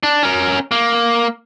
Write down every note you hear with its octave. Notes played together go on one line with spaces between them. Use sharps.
D4
C#4 A#4
A#3